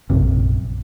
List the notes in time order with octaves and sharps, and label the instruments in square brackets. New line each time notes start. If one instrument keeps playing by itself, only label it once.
[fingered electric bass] A#1 F#2 C3